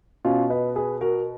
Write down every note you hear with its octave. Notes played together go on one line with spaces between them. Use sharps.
B2 C#4 F4
B4 D#5
G#4 B4
F#4 A#4